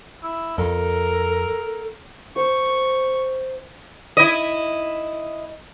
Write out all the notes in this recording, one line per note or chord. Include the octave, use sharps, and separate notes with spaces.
E4
F2 A4 A#4
C5 C#6
E4 D#5